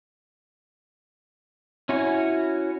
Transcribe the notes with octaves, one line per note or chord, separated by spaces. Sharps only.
C#4 E4 F#4 C#5 G#5